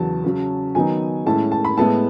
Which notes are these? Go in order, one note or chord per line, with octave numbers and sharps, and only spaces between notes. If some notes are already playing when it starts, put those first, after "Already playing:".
Already playing: E2 C#3 F#3 A5
C#3 F#3 C#4
D#3 F#3 B3 D#4 G#5
A2 G#3 C#4 E4 A5
A5
B5
A2 G#3 B3 E4 A5